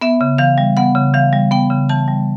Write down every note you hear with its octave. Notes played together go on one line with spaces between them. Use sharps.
B3 E5
C#3
E3 F5
G3
B3 F#5
C#3
E3 F5
G3
B3 G5
C#3
E3 A5
G3